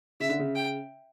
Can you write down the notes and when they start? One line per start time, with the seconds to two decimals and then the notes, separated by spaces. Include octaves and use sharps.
0.20 C#3 E5
0.29 D3
0.39 C#3
0.56 G5